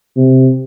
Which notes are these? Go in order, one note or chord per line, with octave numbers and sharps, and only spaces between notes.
C3